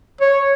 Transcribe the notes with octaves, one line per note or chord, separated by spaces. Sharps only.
C#5